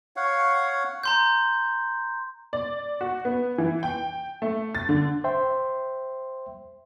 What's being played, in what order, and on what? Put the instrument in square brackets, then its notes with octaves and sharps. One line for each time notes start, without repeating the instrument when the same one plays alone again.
[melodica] C#5 F5 F#5
[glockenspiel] A#5 C6 G6
[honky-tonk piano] D5
F#4
B3
E3
G5
A3
A6
D3
[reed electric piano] C5 E5 G5 C6